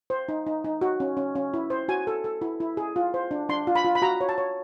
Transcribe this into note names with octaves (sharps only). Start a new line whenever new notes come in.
C5
D#4
D#4
D#4
F#4
C#4
C#4
C#4
E4
C5
F#4 G#5
A4
A4
E4
E4
G#4
F4
C5
D4
D4 C6
F4
B5
F4
B5
F#4 A#5
C#5
A5
C#5